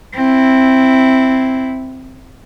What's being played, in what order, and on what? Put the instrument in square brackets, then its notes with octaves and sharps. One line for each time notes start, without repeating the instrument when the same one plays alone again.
[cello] C4 E4